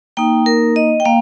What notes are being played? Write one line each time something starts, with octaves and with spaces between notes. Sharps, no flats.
A#3 D#4 G5
A#4
D#5
G5
A#3 F5